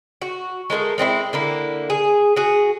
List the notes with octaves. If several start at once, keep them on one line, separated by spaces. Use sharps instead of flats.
F#4
G#3 A3 F4 A#4
G#3 C4 D4 E4
D3 A#3 E4
G#4
F#4 G#4